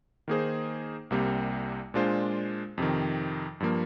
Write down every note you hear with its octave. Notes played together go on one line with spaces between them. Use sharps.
D#3 A#3 D#4 G#4 C5
C2 C3 G3 A#3
A#2 G#3 D4 F4 C5
F2 C3 D#3
G2 F3 A#3